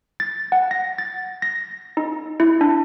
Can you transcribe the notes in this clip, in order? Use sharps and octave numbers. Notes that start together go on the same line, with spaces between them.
A6
F#5
A#6
A6
A#6
D#4
E4
D4